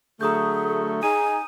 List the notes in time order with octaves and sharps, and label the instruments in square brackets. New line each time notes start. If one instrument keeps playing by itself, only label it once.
[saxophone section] D3 F#3 A3 [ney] G#4 [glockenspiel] A#5 D#6 G6
[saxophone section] D#4 G#4 [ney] G#5 [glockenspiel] D#6 D#7